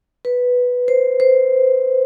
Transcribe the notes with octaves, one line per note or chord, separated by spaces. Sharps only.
B4
C5
C5